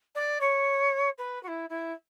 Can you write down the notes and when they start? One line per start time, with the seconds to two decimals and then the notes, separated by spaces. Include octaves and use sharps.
0.15 D5
0.41 C#5
1.18 B4
1.43 F#4
1.48 E4
1.69 E4